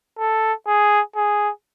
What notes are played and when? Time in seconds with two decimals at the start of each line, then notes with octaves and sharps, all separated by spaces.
0.19 A4
0.67 G#4
1.16 G#4